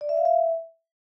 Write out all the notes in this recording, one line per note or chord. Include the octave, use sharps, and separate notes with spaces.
D5
E5
F5
E5